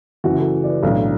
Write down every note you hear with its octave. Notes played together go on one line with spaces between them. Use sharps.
F#1 F#2 E3 F#4
A4
D5
B4
B1 A2 E3 D4 A4